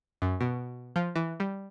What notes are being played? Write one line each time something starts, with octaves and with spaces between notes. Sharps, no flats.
F#2
B2
F3
E3
G3